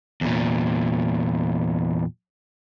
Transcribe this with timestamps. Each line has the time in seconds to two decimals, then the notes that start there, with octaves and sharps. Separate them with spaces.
0.21 E2 A#2